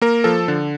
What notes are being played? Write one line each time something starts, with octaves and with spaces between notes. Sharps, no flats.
A#3 A#4
F3 A4
D3